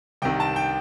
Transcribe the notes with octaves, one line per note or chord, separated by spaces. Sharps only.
C2 C3 D#3 G5
A5
G5